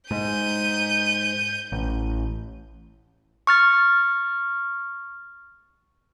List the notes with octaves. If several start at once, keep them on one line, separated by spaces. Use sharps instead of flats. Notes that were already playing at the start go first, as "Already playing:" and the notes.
G#2 G6 D#7
A1
C#6 F6 A6